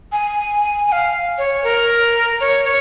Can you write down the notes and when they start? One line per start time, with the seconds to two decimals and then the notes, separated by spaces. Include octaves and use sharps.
0.12 G#5
0.88 G#5
0.92 F5
1.38 C#5
1.64 A#4
2.40 C#5
2.65 C#5